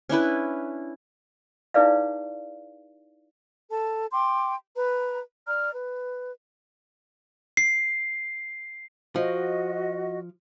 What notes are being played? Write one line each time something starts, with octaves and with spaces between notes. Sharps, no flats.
C#4 D4 E4 B4
D#4 E4 G#4 B4 D5 F5
A4 A5
G5 C6 D6
B4 A#5
D5 A#5 F6
B4
C7
F3 F#4 D#5